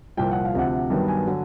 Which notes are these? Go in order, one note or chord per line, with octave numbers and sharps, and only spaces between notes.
C2 A#2 F3 G5
F#5
F5
D2 C3 F3 F#5
G2 D#3 F#3 B3 G5
G#5
D3 F#3